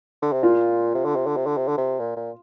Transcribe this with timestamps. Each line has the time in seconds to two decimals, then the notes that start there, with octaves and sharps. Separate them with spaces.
0.22 D3
0.32 C3
0.43 A#2 F4
0.94 C3
1.05 D3
1.16 C3
1.26 D3
1.36 C3
1.46 D3
1.57 C3
1.68 D3
1.78 C3
1.99 A#2
2.16 A#2